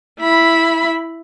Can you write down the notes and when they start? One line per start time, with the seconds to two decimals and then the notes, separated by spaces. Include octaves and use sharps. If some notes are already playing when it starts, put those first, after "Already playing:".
0.20 E4 B5